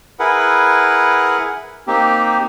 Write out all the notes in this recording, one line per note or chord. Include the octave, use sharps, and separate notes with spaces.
E4 G#4 A#4 B4 F#5
A#3 C4 D#4 G4